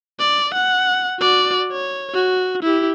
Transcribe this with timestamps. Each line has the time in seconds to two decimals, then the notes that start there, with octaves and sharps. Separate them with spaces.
0.19 D5
0.54 F#5
1.20 F#4 D5
1.72 C#5
2.14 F#4
2.63 E4 G4